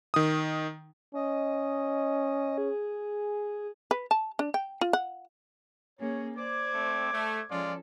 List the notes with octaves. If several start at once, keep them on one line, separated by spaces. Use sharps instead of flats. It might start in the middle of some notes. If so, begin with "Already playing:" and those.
D#3 D#6
C#4 D#5
G#4
B4
A5
D4
G5
F4
F#5
A#3 C#4 G#4 C#5
C5 D5 D6 G#6
A3 C4
A3
F3 G#3 C#4 F4 A4 D5